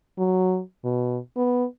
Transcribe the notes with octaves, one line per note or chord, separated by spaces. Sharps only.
F#3
B2
B3